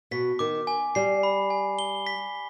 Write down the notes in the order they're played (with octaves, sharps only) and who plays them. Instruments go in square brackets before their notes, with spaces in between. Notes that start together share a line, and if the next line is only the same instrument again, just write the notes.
[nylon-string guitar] B2 [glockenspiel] B6
[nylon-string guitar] D#3 [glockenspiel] D6
[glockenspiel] G#5
[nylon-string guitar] G3 [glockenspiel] C7
[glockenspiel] B5
G#5
G7
B6